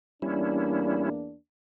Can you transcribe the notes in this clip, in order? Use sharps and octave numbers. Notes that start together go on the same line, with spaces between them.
E2 G3 A#3 C#4 D4 E4